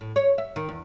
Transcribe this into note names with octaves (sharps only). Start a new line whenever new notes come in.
A2
C#5
E5
D#3
E2